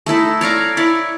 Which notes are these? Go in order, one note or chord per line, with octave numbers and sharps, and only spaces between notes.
A3 D#4 E4 A4
C#5 D5 F5 A#5
E4 C#5 D5